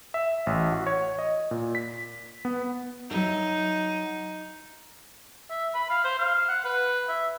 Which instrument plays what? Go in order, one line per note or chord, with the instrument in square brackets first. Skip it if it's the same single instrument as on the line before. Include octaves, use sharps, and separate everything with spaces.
[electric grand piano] E5
A1
F#4
C#5
D#5
A#2
B6
B3
[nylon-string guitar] F#3 E5 [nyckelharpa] D#4
[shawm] E5
B5
F5
C5
F5
F#5
B4
E5